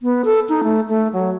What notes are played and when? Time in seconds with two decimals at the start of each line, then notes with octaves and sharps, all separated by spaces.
0.01 B3
0.25 A4
0.49 D#4
0.63 A3
0.89 A3
1.13 F#3